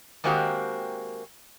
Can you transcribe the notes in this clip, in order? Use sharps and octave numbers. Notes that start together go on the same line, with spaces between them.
D#3 G#3 A#3 C4 F#4 G4